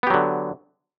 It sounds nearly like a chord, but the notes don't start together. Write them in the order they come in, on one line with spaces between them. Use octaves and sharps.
B3 G4 F#3 D3